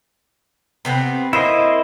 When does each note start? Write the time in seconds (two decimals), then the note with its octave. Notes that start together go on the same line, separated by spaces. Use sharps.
0.85 C3 B3 C4
1.33 A#3 E4 C5 D#5